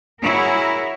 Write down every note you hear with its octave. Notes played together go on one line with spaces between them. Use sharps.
E4 F#4 G#4 A#4 C#5